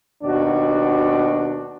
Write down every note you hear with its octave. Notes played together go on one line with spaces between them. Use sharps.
D#2 B2 D4 F#4